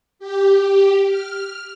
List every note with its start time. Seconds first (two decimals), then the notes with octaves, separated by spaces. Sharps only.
0.19 G4
1.07 F6